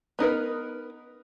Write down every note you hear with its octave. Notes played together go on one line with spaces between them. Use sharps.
B3 D#4 A#4 B4